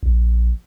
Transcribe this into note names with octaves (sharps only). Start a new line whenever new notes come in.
A#1